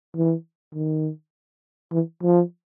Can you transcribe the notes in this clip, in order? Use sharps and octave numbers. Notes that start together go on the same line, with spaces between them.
E3
D#3
E3
F3